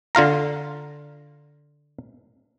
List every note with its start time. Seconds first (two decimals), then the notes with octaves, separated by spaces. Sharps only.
0.15 D3 F4 F5 A#5